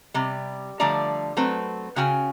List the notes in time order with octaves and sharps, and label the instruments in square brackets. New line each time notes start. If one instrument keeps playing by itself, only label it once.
[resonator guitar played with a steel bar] C3 G3
D3 F3 G3 A3 D5 A#5
F#3 A3 C4 B4
C#3 C#4 F#4 G5 G#5